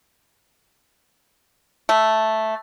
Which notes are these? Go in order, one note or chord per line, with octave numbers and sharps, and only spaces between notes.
A3